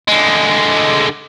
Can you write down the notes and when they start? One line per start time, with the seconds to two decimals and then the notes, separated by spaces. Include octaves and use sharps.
0.08 D3 G#3